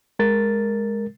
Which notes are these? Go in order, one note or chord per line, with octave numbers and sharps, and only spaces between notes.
G#3 A#4 A6